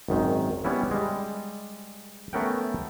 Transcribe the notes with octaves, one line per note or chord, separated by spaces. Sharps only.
G#1 F#2 D#3
G3 B3 C#4 E4
G3 G#3
A3 B3 C#4 A#4 F#5 G5